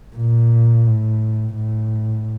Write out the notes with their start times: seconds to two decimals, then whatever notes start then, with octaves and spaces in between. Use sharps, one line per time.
0.16 A#2
0.87 A2
1.55 A2